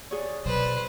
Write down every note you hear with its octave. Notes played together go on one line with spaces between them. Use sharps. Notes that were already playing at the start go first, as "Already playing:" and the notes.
G#4 C#5 D5
B2 F#3 B4 C5